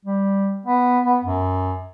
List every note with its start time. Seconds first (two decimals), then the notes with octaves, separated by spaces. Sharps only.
0.05 G3
0.66 B3
1.06 B3
1.24 F#2